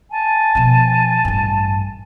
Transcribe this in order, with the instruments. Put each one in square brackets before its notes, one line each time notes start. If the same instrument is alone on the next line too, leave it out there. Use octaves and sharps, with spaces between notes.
[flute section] G#5 A5
[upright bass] B2 F3
A1 G2